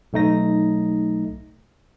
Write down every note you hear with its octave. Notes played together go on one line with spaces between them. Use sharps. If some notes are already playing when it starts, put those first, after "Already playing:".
B1 A3 D#4 A#6